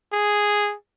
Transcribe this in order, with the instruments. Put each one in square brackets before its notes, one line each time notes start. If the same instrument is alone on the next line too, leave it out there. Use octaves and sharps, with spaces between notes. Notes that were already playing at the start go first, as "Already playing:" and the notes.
[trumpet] G#4